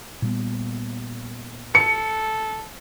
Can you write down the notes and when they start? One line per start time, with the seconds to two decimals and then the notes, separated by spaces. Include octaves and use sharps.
0.22 A#2 G3 B3
1.75 A4 C#7